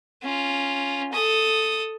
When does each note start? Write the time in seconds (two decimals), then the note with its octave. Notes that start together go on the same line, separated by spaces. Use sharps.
0.23 C#4 F4
1.12 A4 D#6